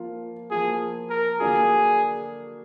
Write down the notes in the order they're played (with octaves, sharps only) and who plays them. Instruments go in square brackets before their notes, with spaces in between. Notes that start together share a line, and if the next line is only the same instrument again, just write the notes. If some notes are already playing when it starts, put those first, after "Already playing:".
Already playing: [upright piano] F3 A#3 F4
[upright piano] F3 A#3 F4 [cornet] G#4
[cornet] A#4
[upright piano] D3 F#3 A#3 D4 F4 [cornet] G#4